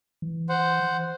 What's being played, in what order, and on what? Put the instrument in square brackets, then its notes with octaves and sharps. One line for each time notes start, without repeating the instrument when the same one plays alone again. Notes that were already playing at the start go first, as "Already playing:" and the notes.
[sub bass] E3
[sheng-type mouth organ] C5 F#5